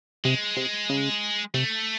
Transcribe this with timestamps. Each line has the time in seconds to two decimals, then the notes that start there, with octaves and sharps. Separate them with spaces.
0.25 C3 G#3
0.57 C3
0.89 C#3
1.54 C3 A3